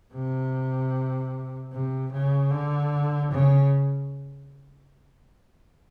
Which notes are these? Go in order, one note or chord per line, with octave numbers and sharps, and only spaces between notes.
C3
C3
C#3
D3
C#3